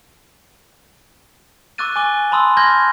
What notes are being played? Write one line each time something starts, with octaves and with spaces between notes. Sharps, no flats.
C#6 D6 E6 F#6 A6 D#7
G#5 C#6 D6 G7
A5 B5 C6 D#6 E6
C6 C#6 F6 G6 G#6 A#6